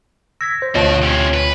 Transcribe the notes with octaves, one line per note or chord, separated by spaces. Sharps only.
E6 G#6 A#6 B6
C5
D2 B2 F4 F#4 C#5 D#5 A5 D7
C3 C#4
B4